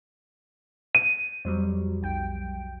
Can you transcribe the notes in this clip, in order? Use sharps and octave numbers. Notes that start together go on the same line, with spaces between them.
D#7
F2 F#3 G3
B1 G5 D7